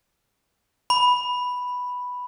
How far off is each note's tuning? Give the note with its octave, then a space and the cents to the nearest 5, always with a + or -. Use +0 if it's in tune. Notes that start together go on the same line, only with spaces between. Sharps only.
B5 +0